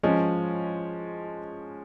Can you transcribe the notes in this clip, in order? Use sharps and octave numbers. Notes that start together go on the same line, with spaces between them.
F3 G#3 C#4